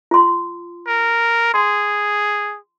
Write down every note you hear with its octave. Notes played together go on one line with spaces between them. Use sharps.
F4 C6
A#4
G#4 C6